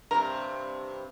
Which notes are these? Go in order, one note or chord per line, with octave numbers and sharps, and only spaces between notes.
G2 C3 A#4